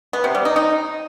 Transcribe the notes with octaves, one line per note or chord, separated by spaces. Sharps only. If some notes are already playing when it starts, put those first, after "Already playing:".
B3
C3
G3
D#4
D#4